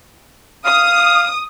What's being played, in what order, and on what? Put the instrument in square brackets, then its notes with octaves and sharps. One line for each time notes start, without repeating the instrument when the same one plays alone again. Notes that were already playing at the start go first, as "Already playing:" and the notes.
[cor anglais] F5 [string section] D#6